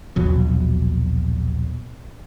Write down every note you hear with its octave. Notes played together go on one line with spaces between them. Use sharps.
A#1 D#2 B2 F#3